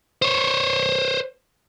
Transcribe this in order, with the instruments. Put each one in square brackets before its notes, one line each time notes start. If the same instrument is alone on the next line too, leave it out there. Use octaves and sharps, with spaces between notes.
[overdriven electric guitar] C5 C#5